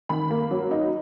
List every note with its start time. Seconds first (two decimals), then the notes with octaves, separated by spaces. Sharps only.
0.09 D#3 B5
0.30 A#3
0.51 F#3
0.71 D#4